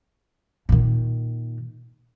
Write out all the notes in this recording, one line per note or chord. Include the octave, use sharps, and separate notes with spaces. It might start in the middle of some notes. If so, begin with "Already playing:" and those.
A#2 D#3